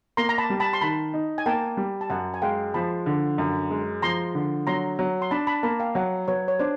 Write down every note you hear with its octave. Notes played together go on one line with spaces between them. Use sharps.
A#3 A#5 C6
A#5
A5 B5
G3
A5 B5
C6
D#3 A5 B5
D#4
G#5
A#3 G5 A5
G3
A5
F#2 F#5 G#5
G#5
G#3 F5 G5
F3 A5 B5
D3
F#2
G#3
F3 A#5 C6
D3
F#3 A#5 C6
F#3
C6
D4 A5 B5
A5 B5
A#3 A5 B5
F5 G5
F#3 E5 F#5
F#3 B4 C#5
C#5
D4 C5 D5